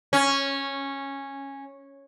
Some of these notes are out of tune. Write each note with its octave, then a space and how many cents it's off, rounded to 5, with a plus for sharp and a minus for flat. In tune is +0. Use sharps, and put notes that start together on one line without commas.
C#4 -10